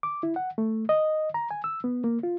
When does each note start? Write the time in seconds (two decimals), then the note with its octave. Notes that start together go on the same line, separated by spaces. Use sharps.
0.03 D6
0.23 E4
0.36 F#5
0.58 A3
0.89 D#5
1.34 A#5
1.51 G#5
1.64 E6
1.84 B3
2.04 A#3
2.23 F4